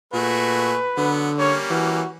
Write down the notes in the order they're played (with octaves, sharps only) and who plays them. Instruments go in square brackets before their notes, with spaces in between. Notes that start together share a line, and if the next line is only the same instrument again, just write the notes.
[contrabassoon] A#2 [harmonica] A3 F#4 G#4 [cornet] B4
[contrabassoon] D3 [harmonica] F#3 B3
[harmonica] G3 A#3 C#4 [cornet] C#5
[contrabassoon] E3 [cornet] F#4